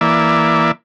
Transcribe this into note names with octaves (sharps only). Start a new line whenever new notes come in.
E3 A#3 D5 E5